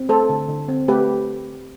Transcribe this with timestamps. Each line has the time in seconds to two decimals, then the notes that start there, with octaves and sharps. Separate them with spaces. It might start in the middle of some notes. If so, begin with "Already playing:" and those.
Already playing: C4
0.09 A3 A4 C5
0.29 D3
0.49 D3
0.69 C4
0.88 A3 G4 B4